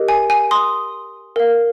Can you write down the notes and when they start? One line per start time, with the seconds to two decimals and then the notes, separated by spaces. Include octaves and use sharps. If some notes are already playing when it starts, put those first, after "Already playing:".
Already playing: G4 A#4 D#5
0.08 G#5
0.30 G#5
0.51 C6 D#6
1.36 A#4 F5